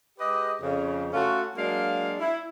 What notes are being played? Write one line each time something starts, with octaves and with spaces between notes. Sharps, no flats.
G#3 G4 B4 D#5
F2 C#3
A3 C#4 F4 F#4 A4
F#3 G#3 A#3 D4 F5
E4